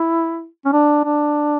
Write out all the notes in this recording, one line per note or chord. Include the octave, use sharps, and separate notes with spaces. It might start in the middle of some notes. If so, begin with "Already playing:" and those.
Already playing: E4
C#4
D4
D4